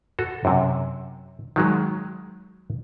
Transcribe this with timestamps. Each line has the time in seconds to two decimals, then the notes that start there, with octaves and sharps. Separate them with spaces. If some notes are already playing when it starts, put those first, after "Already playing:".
0.19 F#4 A4
0.45 F#2 C3
1.56 D#3 F#3 G#3